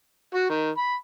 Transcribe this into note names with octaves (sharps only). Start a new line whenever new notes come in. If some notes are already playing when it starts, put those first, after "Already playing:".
F#4
D#3
B5